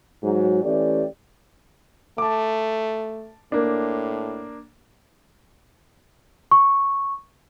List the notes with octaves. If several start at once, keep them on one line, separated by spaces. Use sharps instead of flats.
G#2 F#3 F#4
E3 A3 C#4 G4 D5
A3 A5 D6
A2 A#3 D4
C#6